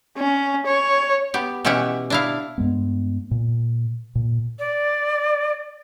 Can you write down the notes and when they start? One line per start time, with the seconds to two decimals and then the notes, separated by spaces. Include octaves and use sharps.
0.17 C#4
0.67 C#5
1.34 B3 G4
1.65 B2 E3 C#4 G4 E5 F#5
2.10 D4 E4 F5
2.58 G2 G#3 B3
3.31 A#2
4.15 A#2
4.59 D5